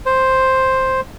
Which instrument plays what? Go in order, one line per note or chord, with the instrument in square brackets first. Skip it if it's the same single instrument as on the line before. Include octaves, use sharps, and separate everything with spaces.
[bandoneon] C5